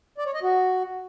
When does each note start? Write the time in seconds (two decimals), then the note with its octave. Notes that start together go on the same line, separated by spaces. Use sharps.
0.18 D5
0.26 C#5
0.34 D#5
0.42 F#4